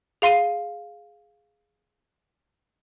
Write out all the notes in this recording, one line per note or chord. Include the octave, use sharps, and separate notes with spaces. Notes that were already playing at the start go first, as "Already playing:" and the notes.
G#4 F5 C6 C7 D#7